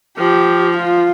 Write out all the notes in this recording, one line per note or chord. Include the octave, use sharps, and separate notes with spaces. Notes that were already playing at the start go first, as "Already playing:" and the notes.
F3 G4
F4